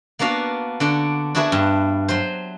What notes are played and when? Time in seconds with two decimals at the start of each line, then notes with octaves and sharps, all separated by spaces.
0.19 A#3 B3 D4 F#4 F5
0.80 D3 D4 F#4
1.35 D4 E4 F#4 G#4 B4
1.52 G2
2.08 F#3 C5